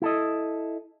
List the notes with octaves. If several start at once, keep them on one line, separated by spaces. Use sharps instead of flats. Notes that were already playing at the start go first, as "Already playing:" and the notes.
E4 A4 D#5